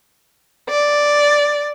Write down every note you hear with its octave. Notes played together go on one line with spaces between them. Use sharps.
D5